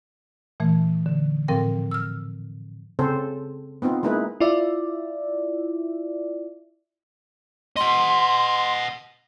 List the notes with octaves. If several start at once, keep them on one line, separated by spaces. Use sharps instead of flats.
A#2 E3 A3
D3
A2 F3 C4 A#4 G5
E6 F6
C#3 C4 A4 C5
B3 C4 D#4 F4
G#3 A#3 D#4 E4 B4
E4 F4 D5 E5
D#5 F#5 C6